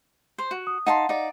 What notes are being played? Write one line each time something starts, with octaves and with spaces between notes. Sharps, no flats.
C5
F#4
D#6
D#4 F5 F#5 A5 C6
D#4 D5